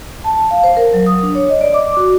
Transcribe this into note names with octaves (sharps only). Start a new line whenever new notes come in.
A5
F5
C5
A#4
F#3
D#6
D4
C#5
D#5
D5
D6
F#4